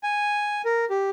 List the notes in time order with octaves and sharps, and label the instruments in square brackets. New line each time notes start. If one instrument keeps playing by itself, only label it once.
[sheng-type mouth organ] G#5
A#4
G4